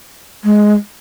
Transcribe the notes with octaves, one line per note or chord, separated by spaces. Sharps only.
G#3